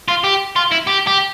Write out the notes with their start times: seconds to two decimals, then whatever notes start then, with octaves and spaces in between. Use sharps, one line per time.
0.08 F4
0.24 G4
0.56 F4
0.71 E4
0.87 G4
1.07 G4